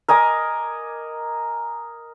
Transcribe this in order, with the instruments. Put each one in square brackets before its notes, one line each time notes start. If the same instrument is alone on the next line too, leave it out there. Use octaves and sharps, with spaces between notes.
[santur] A#4 D#5 G#5 D6